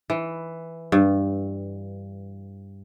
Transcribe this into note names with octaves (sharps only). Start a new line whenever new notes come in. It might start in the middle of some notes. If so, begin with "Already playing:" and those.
E3
G2